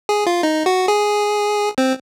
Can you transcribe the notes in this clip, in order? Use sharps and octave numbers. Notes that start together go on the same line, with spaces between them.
G#4
F4
D#4
F#4
G#4
C4